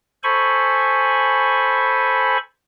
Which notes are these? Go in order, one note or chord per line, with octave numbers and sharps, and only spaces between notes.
A4 C5 G#5 B5 C#6